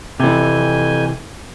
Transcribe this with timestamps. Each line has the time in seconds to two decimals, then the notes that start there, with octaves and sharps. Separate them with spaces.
0.20 F2 C3 E3 G#5 G6